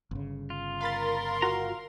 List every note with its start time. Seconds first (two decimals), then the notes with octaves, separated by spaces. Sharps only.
0.11 G1 C#3
0.50 F4
0.81 A#4 F5 B5 C6 A6
1.42 F4 F#4 F5 A#5